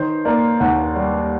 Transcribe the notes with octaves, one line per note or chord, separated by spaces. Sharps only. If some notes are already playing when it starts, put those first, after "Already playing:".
Already playing: D#3 C5
A#3 D5
D#2 F#5
G3